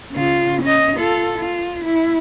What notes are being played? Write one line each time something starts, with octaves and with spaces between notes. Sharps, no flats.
C#3 F4
C#4 D#5
F4 A4
F4
E4